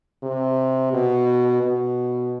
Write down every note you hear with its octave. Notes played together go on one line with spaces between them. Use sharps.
C3
B2
B2